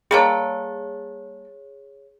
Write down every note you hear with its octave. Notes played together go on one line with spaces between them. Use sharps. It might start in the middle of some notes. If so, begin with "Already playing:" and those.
G3 A#3 G#4 A4 C#5